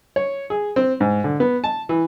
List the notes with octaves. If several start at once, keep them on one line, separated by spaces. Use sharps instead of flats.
C#5
G#4
C4
G#2
D3
B3
A5
E3